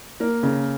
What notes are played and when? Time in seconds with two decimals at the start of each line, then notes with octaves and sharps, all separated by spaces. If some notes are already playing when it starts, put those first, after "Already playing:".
0.20 A#3 A#4
0.43 C#3 A#4